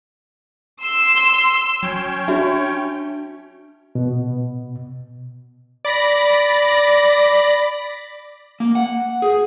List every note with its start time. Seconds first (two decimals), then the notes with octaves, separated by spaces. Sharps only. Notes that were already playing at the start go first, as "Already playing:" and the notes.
0.82 C6 E6
1.83 F#3 C#4 C#5 G5
2.28 D4 F#4 E5
3.95 B2
5.85 D5 B5 A#6
8.60 A#3
8.75 F#5
9.22 G#4